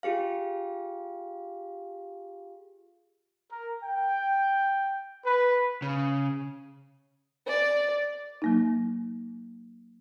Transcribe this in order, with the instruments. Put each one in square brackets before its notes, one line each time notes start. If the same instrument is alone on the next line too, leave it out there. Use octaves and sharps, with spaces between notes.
[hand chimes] F4 G4 G#4 F5
[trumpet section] A#4
G5
B4
[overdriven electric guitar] C#3
[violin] D5
[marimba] F#3 A#3 D#4